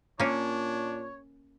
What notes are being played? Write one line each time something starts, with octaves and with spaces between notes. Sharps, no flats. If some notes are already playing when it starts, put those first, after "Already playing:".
A#2 A#3 C#4 D4 C#5